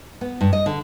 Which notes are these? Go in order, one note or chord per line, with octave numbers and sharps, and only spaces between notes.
B3
G2
D#5
D3